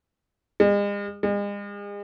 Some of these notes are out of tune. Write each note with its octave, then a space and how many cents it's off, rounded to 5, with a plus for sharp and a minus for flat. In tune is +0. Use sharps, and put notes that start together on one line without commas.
G#3 -40
G#3 -40